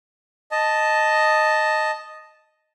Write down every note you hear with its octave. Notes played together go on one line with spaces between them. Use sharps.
D#5 A5